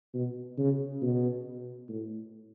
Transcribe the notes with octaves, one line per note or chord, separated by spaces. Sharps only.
B2
C#3
B2
A2